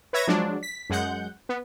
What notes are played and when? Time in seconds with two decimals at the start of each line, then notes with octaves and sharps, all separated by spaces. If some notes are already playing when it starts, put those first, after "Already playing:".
0.13 B4 C#5 E5 G#6 A#6
0.27 F3 F#3 G#3 D4
0.63 B6
0.90 F#2 G#3 F#5 G6
1.49 B3